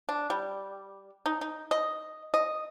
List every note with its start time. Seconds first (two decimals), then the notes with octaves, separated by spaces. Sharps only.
0.09 D4
0.30 G3
1.26 D#4
1.41 D#4
1.71 D#5
2.34 D#5